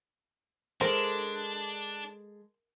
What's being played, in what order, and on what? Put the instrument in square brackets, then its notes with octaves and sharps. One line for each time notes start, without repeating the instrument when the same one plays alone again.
[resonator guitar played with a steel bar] G#3 A4 [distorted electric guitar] D4 [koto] A#4 [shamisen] C5